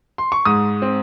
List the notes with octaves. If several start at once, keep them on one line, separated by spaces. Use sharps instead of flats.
C6
C#6
G#2 D#6
C4